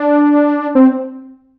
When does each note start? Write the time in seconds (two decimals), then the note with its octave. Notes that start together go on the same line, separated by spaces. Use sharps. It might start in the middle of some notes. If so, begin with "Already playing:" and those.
Already playing: D4
0.75 C4